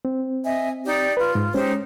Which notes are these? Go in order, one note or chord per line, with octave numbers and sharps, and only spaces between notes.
C4
D#5 E5 G#5
D#4 G4 D5
F4 B4
G#2
G#3 C#4 D#4 G4 C5